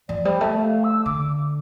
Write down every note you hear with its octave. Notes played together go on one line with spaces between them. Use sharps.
F3 D5
G3 C5
A3 E5
F5
E6
D3 D6